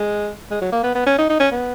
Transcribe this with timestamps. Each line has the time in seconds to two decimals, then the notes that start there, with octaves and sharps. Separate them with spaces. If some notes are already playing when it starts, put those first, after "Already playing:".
Already playing: G#3
0.51 G#3
0.61 F#3
0.72 A#3
0.83 B3
0.95 B3
1.06 C#4
1.18 D#4
1.30 D#4
1.40 C#4
1.52 B3